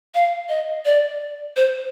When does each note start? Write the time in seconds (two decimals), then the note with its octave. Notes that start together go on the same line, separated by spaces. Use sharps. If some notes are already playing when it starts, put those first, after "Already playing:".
0.15 F5
0.49 D#5
0.85 D5
1.56 C5